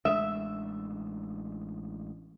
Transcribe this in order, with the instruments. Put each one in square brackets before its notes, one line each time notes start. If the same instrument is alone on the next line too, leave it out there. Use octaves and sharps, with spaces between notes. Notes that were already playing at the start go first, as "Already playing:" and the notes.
[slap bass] A1 G#3 D4 [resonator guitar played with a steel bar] E5